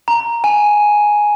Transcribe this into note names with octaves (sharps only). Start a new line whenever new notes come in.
A#5
G#5